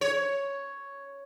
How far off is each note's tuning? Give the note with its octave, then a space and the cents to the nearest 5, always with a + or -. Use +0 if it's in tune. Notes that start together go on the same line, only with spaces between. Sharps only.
C#5 +5